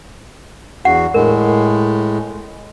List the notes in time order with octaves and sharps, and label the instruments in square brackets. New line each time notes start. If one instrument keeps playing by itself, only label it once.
[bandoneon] E2 F#4 [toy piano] F#5
[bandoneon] A2 G#3 [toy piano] A#4